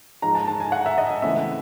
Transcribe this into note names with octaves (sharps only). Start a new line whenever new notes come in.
G#2 F3 G#3 A#5
A5
A5
G#5
F#5
E5
D#5
E5
C#3 E3 A3 C4 D#4 E5